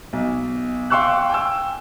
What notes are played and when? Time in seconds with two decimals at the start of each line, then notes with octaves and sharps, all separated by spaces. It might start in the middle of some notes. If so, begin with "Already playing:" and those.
0.13 B1
0.90 F5 G5 C6 C#6 E6 F#6
1.30 G5 G#5 E6